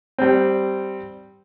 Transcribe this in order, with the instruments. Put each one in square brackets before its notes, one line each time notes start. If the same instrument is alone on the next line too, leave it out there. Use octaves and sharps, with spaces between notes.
[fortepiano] G3 C4